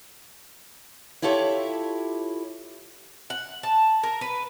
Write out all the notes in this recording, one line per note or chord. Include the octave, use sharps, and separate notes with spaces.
E4 F4 G4 A4 C#5
F#5
A5
A#4
B4